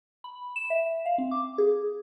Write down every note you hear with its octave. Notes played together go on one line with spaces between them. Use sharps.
B5
E7
E5
F5
C4
D6
G#4